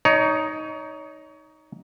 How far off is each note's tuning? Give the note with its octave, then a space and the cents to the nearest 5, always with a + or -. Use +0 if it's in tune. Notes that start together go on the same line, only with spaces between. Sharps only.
D#4 +0 C#5 +30